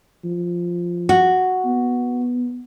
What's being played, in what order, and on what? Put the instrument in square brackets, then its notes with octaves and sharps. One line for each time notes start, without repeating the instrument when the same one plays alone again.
[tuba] F3
[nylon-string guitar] F#4
[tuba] B3